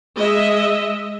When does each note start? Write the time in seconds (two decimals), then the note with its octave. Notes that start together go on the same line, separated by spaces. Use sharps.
0.15 G#3 D#5 E5